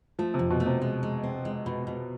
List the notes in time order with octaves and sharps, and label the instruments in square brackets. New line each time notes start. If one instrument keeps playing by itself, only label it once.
[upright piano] F3 [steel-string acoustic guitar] A3
[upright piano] C3
[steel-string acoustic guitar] F2
[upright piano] B2
[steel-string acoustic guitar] A3
[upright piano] C3
[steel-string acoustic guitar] G#3
G#3
C4
G#3
B2
B2